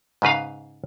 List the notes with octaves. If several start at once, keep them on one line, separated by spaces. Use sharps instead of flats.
G#2 C#3 B4 F5